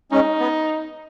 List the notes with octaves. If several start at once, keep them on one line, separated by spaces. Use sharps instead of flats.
G#3 C#4 D#4
B3